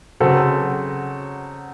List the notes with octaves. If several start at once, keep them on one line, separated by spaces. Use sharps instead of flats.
C#3 F#3 C4 F#4 A4